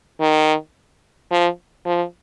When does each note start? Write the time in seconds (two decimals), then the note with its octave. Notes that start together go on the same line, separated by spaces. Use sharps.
0.21 D#3
1.31 F3
1.86 F3